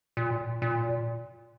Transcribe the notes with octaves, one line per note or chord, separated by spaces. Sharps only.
A#2
A#2